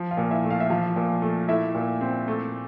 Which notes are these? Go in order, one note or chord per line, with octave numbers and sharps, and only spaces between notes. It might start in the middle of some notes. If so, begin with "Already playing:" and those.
Already playing: F3
F4
A#2
E4 E5
A3
F5
E5
F3 F4 F5
A#2
A3
A3 E4 E5
A#2
C4
A3